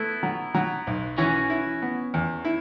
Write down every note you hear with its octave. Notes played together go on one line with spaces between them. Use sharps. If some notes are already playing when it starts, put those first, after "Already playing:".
Already playing: A3 B3 E4
F#3
F#3
B1
E3 C#4 F#4
E4
B3
E2
E4